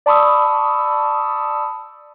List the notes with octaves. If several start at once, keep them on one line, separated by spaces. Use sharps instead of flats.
D5 A5 B5 C#6 D#6 E6